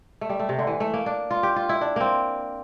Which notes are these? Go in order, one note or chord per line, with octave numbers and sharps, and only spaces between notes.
A3
G3
A3
C3
D3
E3
A3
A#3
D4
F4
G4
F4
E4
D4
A#3 C4